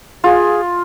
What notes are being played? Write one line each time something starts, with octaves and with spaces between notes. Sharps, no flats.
F4 G#4